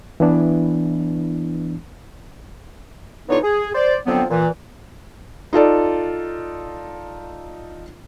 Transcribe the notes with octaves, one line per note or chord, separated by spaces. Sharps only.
E3 B3 D4 E4
D3 E3 B3 D#4 F4 C#5
G#4
C5 D5
D3 F3 F#3 B3 C4
A#2 E3
D#4 F4 A4 D5